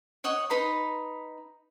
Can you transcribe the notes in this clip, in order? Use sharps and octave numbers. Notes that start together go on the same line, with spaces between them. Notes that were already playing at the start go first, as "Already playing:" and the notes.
C#5 D#5 F#5 C#6
D#4 B4 A#5 C6